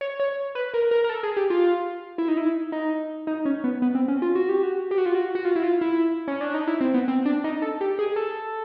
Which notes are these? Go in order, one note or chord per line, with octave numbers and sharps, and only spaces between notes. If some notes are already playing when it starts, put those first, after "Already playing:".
C#5
C#5
B4
A#4
A#4
A#4
A4
G#4
G4
F4
E4
D#4
E4
D#4
D#4
C#4
B3
B3
C4
C#4
F4
F#4
G4
F#4
G4
F#4
F4
F#4
F#4
F4
E4
F4
E4
C#4
D4
D#4
E4
C4
B3
C4
D4
D#4
A4
G4
G#4
A4